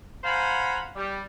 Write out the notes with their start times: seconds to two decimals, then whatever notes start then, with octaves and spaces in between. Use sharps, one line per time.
0.24 C5 F5 F#5 G#5 A#5 B5
0.96 G3